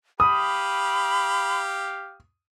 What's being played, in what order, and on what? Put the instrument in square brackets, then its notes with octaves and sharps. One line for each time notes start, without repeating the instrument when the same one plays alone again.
[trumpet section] G4 F5 [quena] B5 [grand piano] D#6